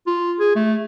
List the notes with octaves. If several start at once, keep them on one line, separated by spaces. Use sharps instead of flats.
F4
G#4
A3